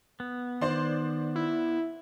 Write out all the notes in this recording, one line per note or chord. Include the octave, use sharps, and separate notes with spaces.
B3
D#3 C5 D5 C6
E4